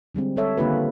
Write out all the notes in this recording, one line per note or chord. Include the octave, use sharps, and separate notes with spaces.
D3 G3 G#3 C4
G3 G#3 A4 C#5 E5
D3 D#3 A#3 F4 G4 B4